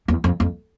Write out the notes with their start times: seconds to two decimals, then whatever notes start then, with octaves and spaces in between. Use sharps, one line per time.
0.08 E2
0.24 F2
0.40 F2